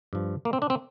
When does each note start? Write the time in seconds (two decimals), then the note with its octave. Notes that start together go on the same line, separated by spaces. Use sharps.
0.13 G2 F3
0.45 A#3
0.53 C4
0.62 D4
0.70 C4